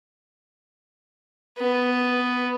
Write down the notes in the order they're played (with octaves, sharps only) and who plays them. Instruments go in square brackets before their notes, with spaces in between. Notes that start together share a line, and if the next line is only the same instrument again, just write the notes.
[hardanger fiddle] B3